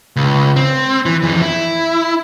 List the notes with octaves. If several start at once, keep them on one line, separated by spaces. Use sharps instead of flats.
C#2
C4
E3
F2 E3
E4